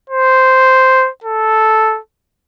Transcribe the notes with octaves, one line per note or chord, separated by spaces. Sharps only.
C5
A4